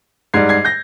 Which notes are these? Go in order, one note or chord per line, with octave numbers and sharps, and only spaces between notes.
G#2 G3 G#6 C7
G#6 C7
G6 A#6